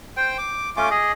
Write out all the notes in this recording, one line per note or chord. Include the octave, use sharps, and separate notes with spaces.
C5 G5
D6
A3 C#4 F4 D6
G#4 D#5